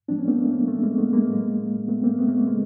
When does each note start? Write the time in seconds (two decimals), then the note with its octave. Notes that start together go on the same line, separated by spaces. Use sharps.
0.08 A2 F3 G#3 C4 D4
0.18 B3 C#4
0.28 A#3 C4
0.38 A3 B3
0.53 A#3 C4
0.68 A3
0.83 G#3 A#3
0.98 A3 B3
1.13 G#3 A#3
1.28 A2 F#3
1.89 A3 B3
2.03 A#3 C4
2.18 A3 B3
2.29 G#3 A#3
2.38 A3
2.47 C#3 G#3